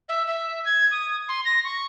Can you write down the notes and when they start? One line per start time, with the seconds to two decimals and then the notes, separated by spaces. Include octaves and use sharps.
0.08 E5
0.27 E5
0.64 G#6
0.91 D#6
1.28 C6
1.45 A#6
1.64 C#6